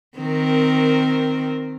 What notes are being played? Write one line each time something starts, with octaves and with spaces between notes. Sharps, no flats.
D#3 C4 A#4